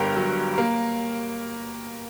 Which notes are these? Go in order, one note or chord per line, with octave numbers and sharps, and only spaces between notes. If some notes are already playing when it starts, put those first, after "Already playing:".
Already playing: G1 G2 D3 G4 A#4 G5 A#5
F#3
A#3